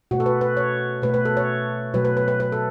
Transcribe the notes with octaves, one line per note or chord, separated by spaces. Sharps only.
B2 A3 F#4
A4
B4
B4
C#5
B2 A3 B4
B4
A4
C#5
B2 F#3 A3 B4
B4
B4
B4
B4
A4